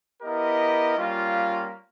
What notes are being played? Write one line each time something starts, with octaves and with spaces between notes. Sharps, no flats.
B3 E4 G4 A#4 D#5
G3 A#3 C#4 F4